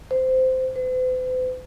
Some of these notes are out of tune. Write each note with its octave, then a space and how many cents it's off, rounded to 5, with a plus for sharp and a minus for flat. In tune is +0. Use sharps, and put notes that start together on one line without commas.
C5 -15
C5 -45